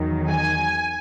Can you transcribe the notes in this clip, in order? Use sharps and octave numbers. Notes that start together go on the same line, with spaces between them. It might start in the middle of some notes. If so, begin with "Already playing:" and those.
Already playing: E2 D#3 F#3
G#5